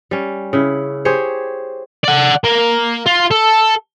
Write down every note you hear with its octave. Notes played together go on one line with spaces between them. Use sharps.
G3 C#4
C#3 E4
G4 G#4 C5 C#5
D5 F#5
A#3
F4
A4